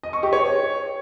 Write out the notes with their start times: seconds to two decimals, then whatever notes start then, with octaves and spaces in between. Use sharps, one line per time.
0.03 D#5
0.13 C#6
0.23 G4
0.33 C#5